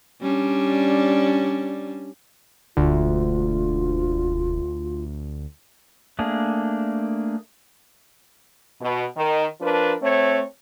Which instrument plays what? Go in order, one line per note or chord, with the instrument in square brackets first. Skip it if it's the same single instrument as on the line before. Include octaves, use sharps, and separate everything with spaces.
[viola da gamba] G3 C#4 D4
[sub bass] E1 [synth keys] D2 [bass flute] F4
[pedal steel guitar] A3 A#3 D4 G#4
[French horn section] B2
D#3
F3 D4 A#4 B4
A3 C4 C#5